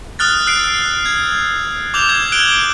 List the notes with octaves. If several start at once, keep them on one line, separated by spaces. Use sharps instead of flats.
D#6 F6 F#6 A6
E6 F#6 C7 D7
G#6
D6 E6 G6 F7 G7
G#6
F#6 D7 F#7 G7